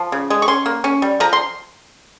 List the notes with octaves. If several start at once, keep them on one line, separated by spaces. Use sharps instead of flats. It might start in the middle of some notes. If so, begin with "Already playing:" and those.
Already playing: F3
C#3
G#3
C#6
C#4 C6
A#3
C#4
G3
F3 A#5
C6